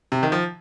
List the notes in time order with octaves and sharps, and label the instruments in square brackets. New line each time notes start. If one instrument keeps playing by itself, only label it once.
[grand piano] C3
D#3
F3